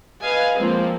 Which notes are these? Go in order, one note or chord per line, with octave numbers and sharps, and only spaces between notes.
B4 D#5 F5 G#5
F3 G#3 A#3 C4